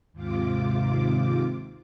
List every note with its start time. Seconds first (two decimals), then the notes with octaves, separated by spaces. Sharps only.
0.13 D#2 G#2 C3 F4 D6